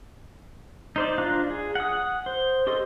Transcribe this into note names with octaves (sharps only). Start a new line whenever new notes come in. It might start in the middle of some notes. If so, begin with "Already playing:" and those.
D#4 C5 D5
D4 F4 F5 A#5 F#6
G#4
F#5 D#6
C5
G4 A4 C5 D#5 C6